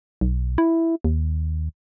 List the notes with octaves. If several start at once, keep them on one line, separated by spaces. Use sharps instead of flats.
B1
E4
D#2